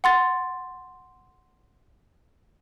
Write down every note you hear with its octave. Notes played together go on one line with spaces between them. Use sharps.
F#5 C6 A6